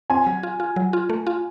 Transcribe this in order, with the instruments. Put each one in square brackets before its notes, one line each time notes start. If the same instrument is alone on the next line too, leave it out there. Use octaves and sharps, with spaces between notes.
[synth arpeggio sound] C4 [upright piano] G#5
[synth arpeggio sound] F#3
F4
F4
F#3
F4
A3
F4